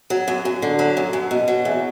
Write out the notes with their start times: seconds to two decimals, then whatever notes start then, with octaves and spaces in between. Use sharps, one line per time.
0.10 F#3
0.28 F#2
0.45 F#2
0.62 D3
0.79 F#3
0.97 F#2
1.13 F#2
1.31 B2
1.48 F#3
1.65 E2